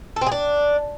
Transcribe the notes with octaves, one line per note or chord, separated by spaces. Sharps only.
A4
C4
G#4
D4